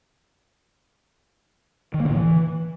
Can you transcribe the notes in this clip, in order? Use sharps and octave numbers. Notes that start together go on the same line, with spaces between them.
D#3
A#3
D3
A2
E3